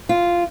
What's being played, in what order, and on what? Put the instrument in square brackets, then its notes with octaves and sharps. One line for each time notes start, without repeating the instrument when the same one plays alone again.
[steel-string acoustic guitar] F4